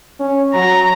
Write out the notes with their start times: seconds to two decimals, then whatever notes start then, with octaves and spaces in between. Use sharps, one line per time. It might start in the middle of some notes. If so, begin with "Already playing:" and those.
0.20 C#4
0.54 F#3 A#5